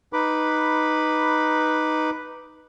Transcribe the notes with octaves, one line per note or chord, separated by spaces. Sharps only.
D#4 B4 B5 D6